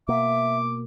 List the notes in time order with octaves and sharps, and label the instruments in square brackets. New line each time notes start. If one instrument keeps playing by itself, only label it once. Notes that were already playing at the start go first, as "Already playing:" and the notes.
[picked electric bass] B2 A#3 [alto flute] E5 [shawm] D6